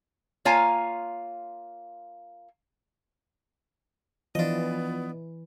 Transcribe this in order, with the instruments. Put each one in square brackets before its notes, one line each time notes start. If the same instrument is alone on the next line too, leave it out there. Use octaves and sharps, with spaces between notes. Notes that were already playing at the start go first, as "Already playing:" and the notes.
[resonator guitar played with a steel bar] A#3 F4 C#5 F5 G#5 A#5
[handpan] E3 [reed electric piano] F3 F4 [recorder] B3 [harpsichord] D4 D#5